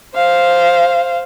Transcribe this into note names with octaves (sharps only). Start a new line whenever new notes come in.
C5 F5